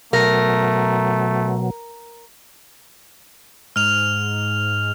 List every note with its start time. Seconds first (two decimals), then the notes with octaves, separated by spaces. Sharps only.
0.13 B2 F#3 A3 A#4
3.76 G#2 F6 F7